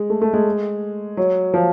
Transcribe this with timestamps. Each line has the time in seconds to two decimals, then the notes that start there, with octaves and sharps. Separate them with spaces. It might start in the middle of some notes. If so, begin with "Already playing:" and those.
Already playing: G#3
0.10 A3
0.21 A3
0.33 G#3
1.17 F#3
1.54 F3